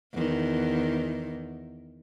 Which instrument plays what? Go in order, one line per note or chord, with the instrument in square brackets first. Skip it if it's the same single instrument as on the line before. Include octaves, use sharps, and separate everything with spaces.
[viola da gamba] E2 D#3